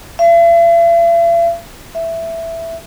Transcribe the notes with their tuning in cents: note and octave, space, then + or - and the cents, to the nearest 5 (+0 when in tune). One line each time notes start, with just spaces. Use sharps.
E5 +45
E5 +5